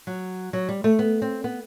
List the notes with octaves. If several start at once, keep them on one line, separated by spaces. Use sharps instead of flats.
F#3
F#3
G3
A3
B3
C4
B3